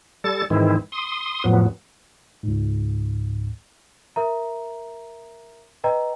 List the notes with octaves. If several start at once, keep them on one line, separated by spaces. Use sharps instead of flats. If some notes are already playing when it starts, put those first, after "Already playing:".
G3 A4 A6
G#2 D#3 E3 G#3 C4 E4
C6 D#6
F2 A2 F3 F#3 B3
C#2 G#2
A#4 E5 A#5
B4 D#5 G5 A#5